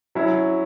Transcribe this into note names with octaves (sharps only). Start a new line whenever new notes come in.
F#3 C#4 E4